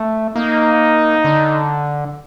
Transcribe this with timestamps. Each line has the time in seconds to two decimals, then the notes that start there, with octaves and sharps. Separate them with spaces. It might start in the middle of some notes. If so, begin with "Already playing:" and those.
Already playing: A3
0.35 A#3 D#4
1.25 D3